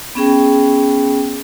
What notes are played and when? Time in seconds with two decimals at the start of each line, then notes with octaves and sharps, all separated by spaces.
0.15 B3 C#4 G#4 G5